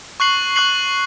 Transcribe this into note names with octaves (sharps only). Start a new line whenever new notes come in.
C#6 F#6 C7 F#7
C#6 F#6 C7 F#7